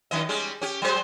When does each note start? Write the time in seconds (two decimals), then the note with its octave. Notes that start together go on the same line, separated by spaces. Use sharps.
0.11 F#2 D#3 D#5
0.29 G3 G#3 C#4
0.62 C#4 G4
0.82 F#3 G#3 C5